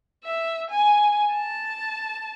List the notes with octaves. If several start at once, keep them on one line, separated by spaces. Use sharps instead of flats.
E5
G#5
A5